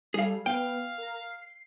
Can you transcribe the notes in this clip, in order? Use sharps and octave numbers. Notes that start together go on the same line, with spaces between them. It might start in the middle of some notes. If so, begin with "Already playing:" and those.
G3 G#4 A4 F5
B3 F5 G5
A#4 A#5
C7